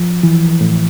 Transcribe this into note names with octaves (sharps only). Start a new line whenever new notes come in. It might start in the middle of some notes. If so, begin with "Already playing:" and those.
Already playing: F3
E3
A2